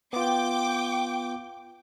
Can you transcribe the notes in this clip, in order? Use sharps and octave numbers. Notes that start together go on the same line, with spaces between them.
B3 F4 G5 D6